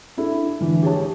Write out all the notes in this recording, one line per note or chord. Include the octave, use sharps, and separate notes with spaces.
D4 E4 A4
D3 E3
G4 G#4 C#5 A5